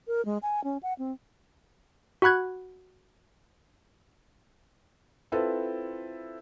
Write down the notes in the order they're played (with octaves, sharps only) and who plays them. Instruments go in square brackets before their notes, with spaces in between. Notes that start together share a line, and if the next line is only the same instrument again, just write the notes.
[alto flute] A#4
G#3
G#5
C#4
F#5
C4
[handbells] F#4 F#5 B5 F#6 G#6
[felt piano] C4 E4 F4 A4 B4